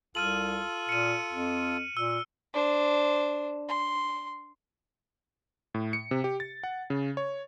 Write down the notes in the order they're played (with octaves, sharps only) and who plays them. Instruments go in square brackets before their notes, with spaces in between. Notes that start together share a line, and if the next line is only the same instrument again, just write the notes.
[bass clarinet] C2 [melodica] F4 A4 [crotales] F6 D#7 F#7
[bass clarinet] A#2 [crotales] C#7 D#7
[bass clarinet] F2
[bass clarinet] A#2 [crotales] E6
[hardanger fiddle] D4 C5
C6
[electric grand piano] A2
C#7
C3
G4
A6
F#5
C#3
C#5